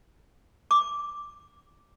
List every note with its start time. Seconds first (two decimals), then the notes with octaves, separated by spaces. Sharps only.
0.71 D6